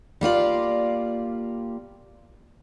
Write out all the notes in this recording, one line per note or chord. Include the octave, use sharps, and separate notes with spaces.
G3 A#3 F4 D5